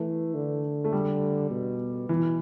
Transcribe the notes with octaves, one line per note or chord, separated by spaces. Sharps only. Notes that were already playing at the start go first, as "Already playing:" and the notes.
Already playing: E3 A3
D3
A3
G3
B2
B2 E3